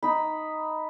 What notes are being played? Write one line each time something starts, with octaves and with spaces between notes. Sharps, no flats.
D#4 B5